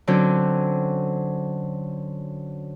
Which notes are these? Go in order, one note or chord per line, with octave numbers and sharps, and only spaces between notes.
D3 F#3 C4 C#4 F#4